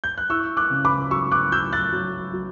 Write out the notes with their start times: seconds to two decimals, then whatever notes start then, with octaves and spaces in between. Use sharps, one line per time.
0.04 G6
0.18 F#6
0.29 E4 C#6 E6
0.57 D6 F#6
0.70 C#3
0.85 B5 D6
1.11 F#3 C#6 E6
1.31 D6 F#6
1.52 F#3 E6 G6
1.73 F#6 A6
1.93 F#3
2.33 F#3